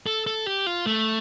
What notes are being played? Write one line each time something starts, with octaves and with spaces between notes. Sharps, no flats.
A4
A4
G4
F4
A3